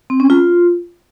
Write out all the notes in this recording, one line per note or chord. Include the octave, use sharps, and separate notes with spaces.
C4
C#4
F4